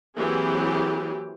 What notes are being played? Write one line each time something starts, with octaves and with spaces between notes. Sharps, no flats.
E3 F#3 A#3 C4 G4 G#4